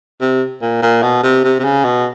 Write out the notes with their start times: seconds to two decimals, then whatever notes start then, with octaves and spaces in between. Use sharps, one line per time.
0.21 C3
0.62 A#2
0.82 A#2
1.03 B2
1.23 C3
1.44 C3
1.59 C3
1.64 C#3
1.85 B2